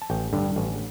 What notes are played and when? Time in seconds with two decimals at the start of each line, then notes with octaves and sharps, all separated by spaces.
0.02 A5
0.10 A1 G5
0.33 G2 D3
0.56 A1